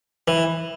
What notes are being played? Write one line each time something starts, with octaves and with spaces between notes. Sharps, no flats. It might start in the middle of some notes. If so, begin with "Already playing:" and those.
E3